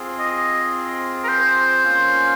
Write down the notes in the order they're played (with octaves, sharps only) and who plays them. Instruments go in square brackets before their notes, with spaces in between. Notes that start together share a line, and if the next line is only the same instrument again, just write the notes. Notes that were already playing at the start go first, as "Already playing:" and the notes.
Already playing: [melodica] C4 F4 G#4
[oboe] D#5
A#4
C5
[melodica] A#3 C#4 F4